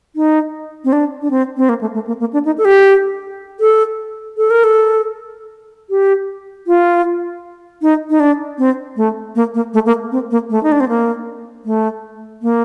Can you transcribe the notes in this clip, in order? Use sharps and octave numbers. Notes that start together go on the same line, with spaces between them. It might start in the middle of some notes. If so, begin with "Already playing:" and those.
D#4
C4
D4
D4
C4
C4
A#3
A3
A3
A#3
A#3
D4
D#4
A4
G4
A4
A4
A#4
A4
G4
F4
D#4
D#4
D4
C4
A3
A#3
A#3
A3
A#3
C4
A#3
A3
D#4
D4
C4
A#3
A3
A#3